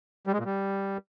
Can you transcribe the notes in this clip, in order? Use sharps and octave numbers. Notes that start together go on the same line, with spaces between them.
G3
G#3
A#2
G3